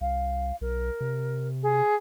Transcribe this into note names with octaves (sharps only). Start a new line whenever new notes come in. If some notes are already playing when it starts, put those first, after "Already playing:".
C2 F5
B1 A#4
C3
G#4